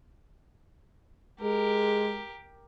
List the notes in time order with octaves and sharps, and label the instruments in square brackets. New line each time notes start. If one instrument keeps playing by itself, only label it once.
[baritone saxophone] G#3 [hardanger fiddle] G4 A#4